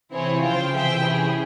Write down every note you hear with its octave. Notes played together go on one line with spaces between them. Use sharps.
C3 E3 C4 E4 G#4 C#5
C#3 F3 F4 C5 G5
C3 E3 G#4 C5 E5 G5
C#4 E4 G#4